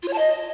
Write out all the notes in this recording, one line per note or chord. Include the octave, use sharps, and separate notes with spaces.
F4
C#5
A5
D#5